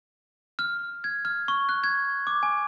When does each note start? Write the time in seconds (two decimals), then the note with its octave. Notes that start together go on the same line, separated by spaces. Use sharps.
0.59 F6
1.04 G#6
1.25 F6
1.48 C#6
1.69 F#6
1.84 G#6
2.27 D6
2.43 G#5